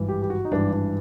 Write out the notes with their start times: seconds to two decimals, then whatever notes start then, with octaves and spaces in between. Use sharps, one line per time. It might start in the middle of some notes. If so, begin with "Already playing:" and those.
Already playing: G#1 G2 E3
0.09 G4
0.22 G4
0.30 F#4
0.45 D#4
0.51 G#1 G2 E3 D4
0.73 D4